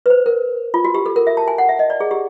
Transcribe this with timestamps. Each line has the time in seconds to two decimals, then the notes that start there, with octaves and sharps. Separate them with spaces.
0.06 B4
0.10 C5
0.26 A#4
0.74 F4
0.84 F#4
0.95 G4
1.06 A4
1.16 A#4
1.27 E5
1.37 A5
1.48 G#5
1.58 F#5
1.69 E5
1.79 D#5
1.90 D5
2.00 G#4
2.11 G4